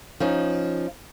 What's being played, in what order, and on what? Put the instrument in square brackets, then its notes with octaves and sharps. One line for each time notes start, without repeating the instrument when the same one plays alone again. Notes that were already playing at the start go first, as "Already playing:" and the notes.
[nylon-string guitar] F3 C#4 D#4